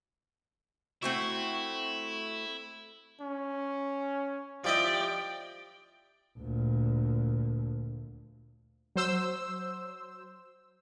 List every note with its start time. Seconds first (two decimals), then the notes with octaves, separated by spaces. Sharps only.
1.03 A3 C4 E4 F#4
3.21 C#4
4.64 F3 E4 G4 D5 D#5 G5
6.38 D2 A#2
8.96 F#3 C5 E6